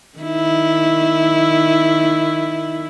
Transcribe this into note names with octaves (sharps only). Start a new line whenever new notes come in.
D#3 E4